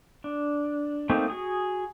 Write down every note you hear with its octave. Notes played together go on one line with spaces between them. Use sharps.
D4
A3 A#3 C4 D#4
F#4 G#4 D#6